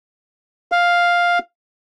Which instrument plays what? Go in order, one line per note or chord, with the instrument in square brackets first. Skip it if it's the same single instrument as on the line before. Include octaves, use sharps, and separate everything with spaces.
[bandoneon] F5